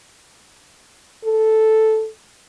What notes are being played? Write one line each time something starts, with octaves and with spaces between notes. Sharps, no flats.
A4